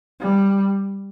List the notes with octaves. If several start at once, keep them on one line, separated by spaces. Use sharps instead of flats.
G3